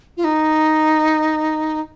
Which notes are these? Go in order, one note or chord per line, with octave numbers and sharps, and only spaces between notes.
F4
D#4